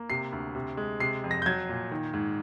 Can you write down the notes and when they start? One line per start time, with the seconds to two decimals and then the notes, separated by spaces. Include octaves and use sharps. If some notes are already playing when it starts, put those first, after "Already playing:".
Already playing: A#3
0.10 C3 C7
0.32 D2
0.55 C3
0.77 G#3
1.00 C3 C7
1.24 F2
1.31 A#6
1.42 G6
1.46 F#3 G#6
1.69 A#2
1.91 D#3
2.14 G#2